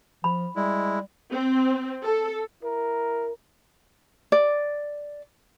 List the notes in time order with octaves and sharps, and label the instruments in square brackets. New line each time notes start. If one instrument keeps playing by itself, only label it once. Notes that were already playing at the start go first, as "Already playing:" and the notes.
[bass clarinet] F3 [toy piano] B5
[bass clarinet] G3 [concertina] G#3 E4
[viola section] C4
A4
[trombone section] E4 A#4
[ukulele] D5